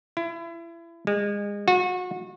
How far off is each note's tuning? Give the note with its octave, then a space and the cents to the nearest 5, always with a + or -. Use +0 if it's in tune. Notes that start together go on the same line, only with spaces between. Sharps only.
E4 +30
G#3 -30
F#4 -30